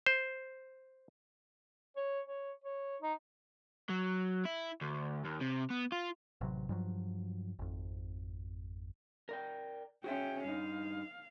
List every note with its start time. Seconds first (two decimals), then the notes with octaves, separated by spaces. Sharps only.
0.06 C5
1.96 C#5
2.27 C#5
2.64 C#5
3.02 D#4
3.90 F#3
4.46 E4
4.81 D2
5.25 D#2
5.41 C3
5.70 B3
5.92 F4
6.41 A1 C3 F#3
6.69 G2 F3 F#3
7.59 G#1 F2
9.29 A#4 D5 G5
10.04 C#4 F#4 G#4 E5 G5
10.44 G2 D#4 F5